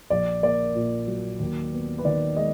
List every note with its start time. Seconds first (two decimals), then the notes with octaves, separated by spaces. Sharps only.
0.10 A#1 D5
0.43 A#3 D5
0.75 A#2
1.07 F#3
1.40 D#2
1.72 B3
1.98 B4
2.04 D#3 D5
2.36 G#3 D#5